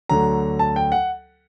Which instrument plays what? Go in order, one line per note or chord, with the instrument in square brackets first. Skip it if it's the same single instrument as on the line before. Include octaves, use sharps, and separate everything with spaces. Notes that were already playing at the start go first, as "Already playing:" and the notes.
[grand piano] D2 D3 F#3 A#5
A5
G5
F#5